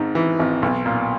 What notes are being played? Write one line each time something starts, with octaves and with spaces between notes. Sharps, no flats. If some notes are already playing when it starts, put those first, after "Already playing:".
Already playing: G#1 G#2
E3
G#1
B1
A#2